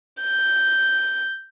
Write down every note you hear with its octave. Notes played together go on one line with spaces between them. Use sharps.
G6